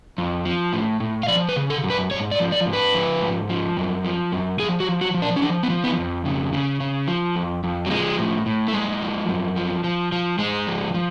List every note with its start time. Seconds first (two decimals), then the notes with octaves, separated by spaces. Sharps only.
0.18 F2
0.45 F3
0.73 A2
1.00 A2
1.23 F5
1.28 F3 D5
1.49 B4
1.56 C#3
1.70 A4
1.84 F#2
1.90 B4
2.11 G#2 C#5
2.31 D5
2.39 F3
2.52 D5
2.66 G#2
2.73 B4
2.94 F3
3.21 G#2
3.49 F3
3.77 F#2
4.05 F3
4.32 F#2
4.59 F3 G#4
4.80 F#4
4.87 F3
5.01 F#4
5.14 F3
5.22 D4
5.36 C#4
5.42 F3 D4
5.63 B3
5.70 F3
5.84 B3
5.98 F2
6.25 C#3
6.53 C#3
6.80 C#3
7.08 F3
7.36 F2
7.64 F2
7.86 F#3
7.91 F3 G#3
8.18 A2
8.46 A2
8.68 A3
8.73 F#2 G#3
9.01 F3
9.29 F#2
9.56 F3
9.84 F3
10.12 F3
10.39 G#2 G#3
10.67 F3
10.94 F3